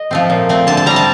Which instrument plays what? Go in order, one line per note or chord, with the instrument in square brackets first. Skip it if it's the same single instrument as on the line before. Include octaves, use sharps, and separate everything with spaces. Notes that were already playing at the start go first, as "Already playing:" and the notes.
Already playing: [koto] D#5
F3 A3 C4
A#2
A3 C4
D3 A5
A5
G3 C4 A#5
A5